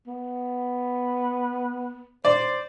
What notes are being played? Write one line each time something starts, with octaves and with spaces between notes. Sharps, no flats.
B3
C5 D5